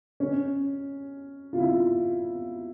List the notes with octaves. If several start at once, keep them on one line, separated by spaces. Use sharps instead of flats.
C#4
F4
E4